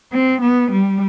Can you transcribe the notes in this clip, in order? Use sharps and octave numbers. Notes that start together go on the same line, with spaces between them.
C4
B3
G3